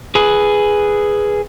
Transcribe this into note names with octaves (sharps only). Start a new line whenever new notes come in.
G#4 B4